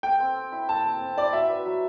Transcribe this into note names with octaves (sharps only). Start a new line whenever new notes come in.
A4 G5
C4
C4
E4
A4 A5
C4
C4
E4 D5
F#4 E5
B4
F#3